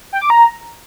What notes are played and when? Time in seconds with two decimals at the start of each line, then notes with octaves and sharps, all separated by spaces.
0.13 G5
0.21 D6
0.30 A#5